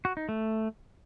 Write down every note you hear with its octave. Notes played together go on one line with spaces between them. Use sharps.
F#4
D#4
A3